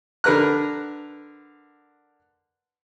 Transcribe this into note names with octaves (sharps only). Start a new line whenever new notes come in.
D3 A#4 B4 A#5 F#6